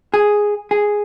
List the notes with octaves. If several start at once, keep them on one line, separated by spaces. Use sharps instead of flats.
G#4
G#4